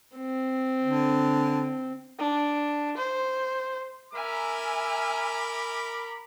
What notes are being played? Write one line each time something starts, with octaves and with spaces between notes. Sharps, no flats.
C4
D3
D4
C5
A#4 E5 G#5 B5 D6 F6